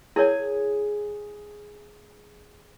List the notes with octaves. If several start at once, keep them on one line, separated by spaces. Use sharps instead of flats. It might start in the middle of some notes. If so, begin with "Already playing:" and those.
E4 G#4 A#4 C#5 G#5